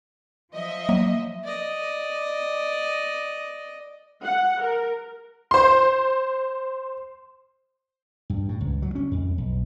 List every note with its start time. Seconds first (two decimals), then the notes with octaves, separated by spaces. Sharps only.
0.52 F3 D#5 E5
0.89 F#3 A#3
1.44 D5 D#5
4.23 F#5
4.62 A#4
5.51 C5 C6
8.30 G2
8.49 A2
8.61 C#2
8.82 F#3
8.95 C#4
9.11 F2
9.38 B1